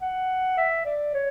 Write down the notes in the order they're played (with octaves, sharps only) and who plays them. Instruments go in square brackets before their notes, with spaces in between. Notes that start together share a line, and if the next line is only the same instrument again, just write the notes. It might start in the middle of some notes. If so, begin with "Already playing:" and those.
[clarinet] F#5
E5
D5
C#5